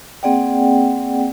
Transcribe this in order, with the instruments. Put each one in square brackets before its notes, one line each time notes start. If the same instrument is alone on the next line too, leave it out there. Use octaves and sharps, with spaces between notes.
[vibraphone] A#3 C4 G#4 D5 F#5 G5